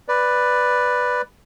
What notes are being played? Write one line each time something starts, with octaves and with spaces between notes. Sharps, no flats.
B4 D5